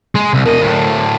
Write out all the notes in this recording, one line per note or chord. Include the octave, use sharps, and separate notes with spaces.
G#3
C2
E2 A#4 D#5
D2 A2